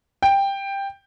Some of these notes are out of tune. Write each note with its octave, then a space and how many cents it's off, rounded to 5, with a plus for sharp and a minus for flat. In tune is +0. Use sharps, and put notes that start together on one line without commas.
G5 +10